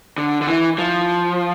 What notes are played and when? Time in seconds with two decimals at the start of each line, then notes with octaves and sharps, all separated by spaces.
0.18 D3
0.41 D3
0.47 E3
0.78 F3